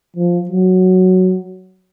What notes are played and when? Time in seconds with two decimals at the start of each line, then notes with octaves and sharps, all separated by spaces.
0.16 F3
0.49 F#3